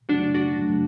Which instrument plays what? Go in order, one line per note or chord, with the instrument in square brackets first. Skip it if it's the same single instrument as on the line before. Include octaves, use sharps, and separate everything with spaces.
[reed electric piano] F#2 C#3 F#3 A3 [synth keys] D4 F#4
[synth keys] D4 F#4
[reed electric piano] F#2 C#3 F#3 A3